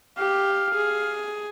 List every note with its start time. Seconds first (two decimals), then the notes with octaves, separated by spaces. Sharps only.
0.18 G4 F5
0.74 G#4